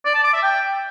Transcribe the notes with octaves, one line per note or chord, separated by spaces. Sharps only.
D5
A5
D6
E5
G5